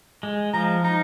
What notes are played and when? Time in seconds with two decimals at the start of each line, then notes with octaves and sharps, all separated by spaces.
0.23 G#3
0.54 F3 A#5
0.84 D#4 A#5